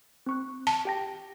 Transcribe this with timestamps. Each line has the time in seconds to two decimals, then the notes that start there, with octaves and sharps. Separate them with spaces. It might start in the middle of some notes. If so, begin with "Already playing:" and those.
0.26 C4 C#6 F#6
0.67 A5
0.85 G4 G5 A#6